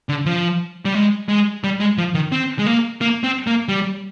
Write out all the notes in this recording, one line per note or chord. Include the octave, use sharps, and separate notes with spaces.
D3
F3
G3
G#3
G#3
G3
G#3
F3
D#3
C4
G#3
A#3
A#3
C4
A#3
G3